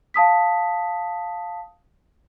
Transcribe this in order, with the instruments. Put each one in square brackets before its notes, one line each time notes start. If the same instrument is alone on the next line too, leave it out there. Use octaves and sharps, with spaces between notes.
[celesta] F5 A5 D#6 B6